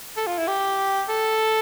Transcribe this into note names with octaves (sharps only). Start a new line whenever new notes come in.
A4
F4
E4
G4
A4